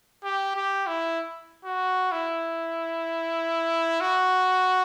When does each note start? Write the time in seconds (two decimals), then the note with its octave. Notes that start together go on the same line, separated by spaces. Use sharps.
0.24 G4
0.55 G4
0.87 E4
1.65 F#4
2.12 E4
4.01 F#4